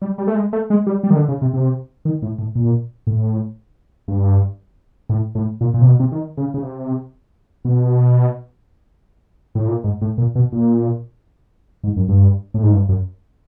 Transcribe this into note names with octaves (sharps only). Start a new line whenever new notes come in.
G3
G3
A3
G#3
A3
G#3
G3
G3
D#3
D3
C#3
C3
C3
D#3
A2
A2
A#2
A2
G2
A2
A2
A#2
A#2
C3
B2
C3
D#3
C#3
C#3
C3
B2
A2
A#2
G#2
A2
A#2
B2
A#2
G#2
F#2
G2
A2
G#2
G2
F#2